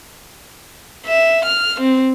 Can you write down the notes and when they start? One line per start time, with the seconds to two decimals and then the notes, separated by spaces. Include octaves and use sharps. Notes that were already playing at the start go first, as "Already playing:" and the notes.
1.06 E5
1.45 F6
1.81 C4